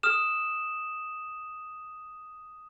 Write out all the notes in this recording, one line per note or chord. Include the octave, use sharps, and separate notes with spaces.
D#6 F6 E7